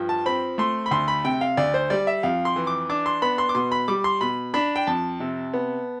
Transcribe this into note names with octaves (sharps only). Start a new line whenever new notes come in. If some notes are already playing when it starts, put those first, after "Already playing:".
Already playing: G2 F3
A5
C4 B5
A3 C6
B5
D2 C6
B5
C3 G5
F5
D2 D5
C5
G3 D5
E5
F2 F5
C6
E3
D6
D4 D6
C6
B3 B5
C6
D6
B2 C6
B5
G3 D6
C6
B2 B5
D4 B5
G5
F2 A5
C3
B3